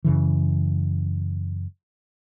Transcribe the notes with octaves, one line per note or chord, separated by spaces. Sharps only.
F#2 C#3 E3